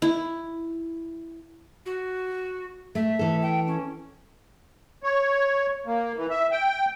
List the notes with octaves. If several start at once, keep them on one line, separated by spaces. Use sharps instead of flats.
E4
F#4
A3 E5
E3 A4
G5
C#4
C#5
A#3
E3
E5
G5